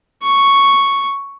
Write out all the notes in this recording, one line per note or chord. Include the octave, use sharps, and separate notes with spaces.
C#6